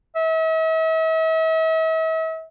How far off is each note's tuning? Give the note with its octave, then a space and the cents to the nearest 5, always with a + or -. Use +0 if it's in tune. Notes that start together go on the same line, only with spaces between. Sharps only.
E5 -40